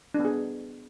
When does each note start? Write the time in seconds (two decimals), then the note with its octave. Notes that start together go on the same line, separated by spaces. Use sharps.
0.14 D4
0.20 B3
0.25 G#4